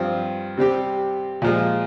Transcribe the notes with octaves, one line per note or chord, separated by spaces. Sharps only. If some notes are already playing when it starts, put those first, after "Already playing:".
Already playing: G2 F3 C4
C3 G3 C4 G4
A#2 F3 G#3